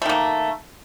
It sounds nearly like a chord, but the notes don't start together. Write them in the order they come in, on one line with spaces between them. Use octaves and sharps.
A3 D#3 A#3